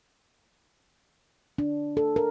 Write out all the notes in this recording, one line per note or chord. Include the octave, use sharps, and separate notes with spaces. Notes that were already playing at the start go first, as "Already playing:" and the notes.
D4
A4
A#4